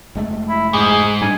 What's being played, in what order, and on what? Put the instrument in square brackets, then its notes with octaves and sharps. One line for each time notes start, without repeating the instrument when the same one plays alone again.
[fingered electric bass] F1 G#3 A3
[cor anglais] E4
[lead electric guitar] G#2 [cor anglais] G#4
[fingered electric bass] G3 G#3 D4 [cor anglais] G#5